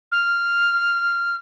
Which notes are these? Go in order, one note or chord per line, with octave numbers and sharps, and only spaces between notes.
F6